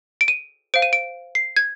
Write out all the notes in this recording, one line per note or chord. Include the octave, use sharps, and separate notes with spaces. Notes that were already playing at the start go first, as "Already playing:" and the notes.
D7
D#7
C5 F5 D7
D#7
D7
C7
G#6